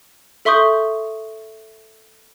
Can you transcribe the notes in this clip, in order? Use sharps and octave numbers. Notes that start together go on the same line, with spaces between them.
A4 E5 C6 C#6 D#6 G6